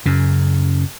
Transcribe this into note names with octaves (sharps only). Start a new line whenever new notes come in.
F#2 C#3